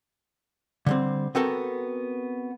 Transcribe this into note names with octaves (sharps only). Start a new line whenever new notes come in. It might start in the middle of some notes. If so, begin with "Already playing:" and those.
D3 G3 C4
B3 C4 F#4 A4 A#4